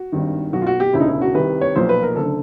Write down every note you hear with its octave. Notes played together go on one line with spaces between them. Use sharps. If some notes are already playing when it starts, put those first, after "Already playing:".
Already playing: F#4
G#1 G2 D#3
B1 B2 F#4
F4
F#4
G4
E1 D2 C#3 E4
D#4
E4
F#4
C2 C3 D#3 B4
C#5
B1 A#2 F3 C5
B4
A#4
F#1 D3 A4